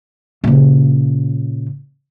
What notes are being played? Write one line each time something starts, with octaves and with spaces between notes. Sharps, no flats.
A#2 C#3